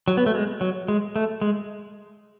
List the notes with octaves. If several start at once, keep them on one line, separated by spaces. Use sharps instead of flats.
F#3
B3
A3
G#3
F#3
G#3
A3
G#3